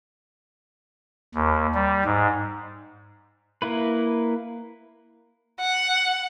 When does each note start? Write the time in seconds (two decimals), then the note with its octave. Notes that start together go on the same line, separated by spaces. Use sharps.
1.34 D#2
1.75 G3
2.05 G#2
3.62 A#3 E4 B4
5.60 F#5